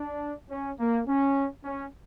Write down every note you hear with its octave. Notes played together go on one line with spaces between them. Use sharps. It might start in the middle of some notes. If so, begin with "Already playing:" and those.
Already playing: D4
C#4
A#3
C#4
C#4